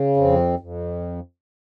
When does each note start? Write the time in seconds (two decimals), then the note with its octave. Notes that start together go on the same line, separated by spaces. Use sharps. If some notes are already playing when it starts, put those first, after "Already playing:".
Already playing: C#3
0.17 F2 C4
0.59 F2